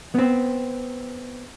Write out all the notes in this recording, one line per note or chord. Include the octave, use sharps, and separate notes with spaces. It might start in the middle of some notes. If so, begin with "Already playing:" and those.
B3 C4